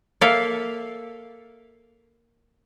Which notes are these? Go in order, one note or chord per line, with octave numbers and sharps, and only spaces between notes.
A#3 A4 E5 F5